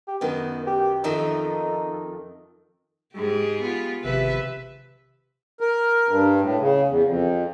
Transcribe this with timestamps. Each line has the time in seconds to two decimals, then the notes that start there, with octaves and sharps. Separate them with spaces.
0.08 G4
0.21 F#2 D#3 B3
0.67 G4
1.04 F2 D#3 D#4 E5
3.14 G#2 G4 G#4
3.61 B3 F4
4.04 G#1 C3 F3 B4 E5
5.61 A#4
6.08 G2
6.41 A2
6.59 C#3
6.88 E2
7.04 F2